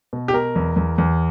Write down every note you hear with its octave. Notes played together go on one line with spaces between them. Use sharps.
B2
G4
B2 A#4
E2
E2
E2